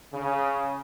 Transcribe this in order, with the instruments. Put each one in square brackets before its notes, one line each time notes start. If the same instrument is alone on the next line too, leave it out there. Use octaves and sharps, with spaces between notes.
[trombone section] C#3